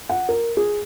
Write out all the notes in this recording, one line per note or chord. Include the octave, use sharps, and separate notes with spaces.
F#5
A#4
G#4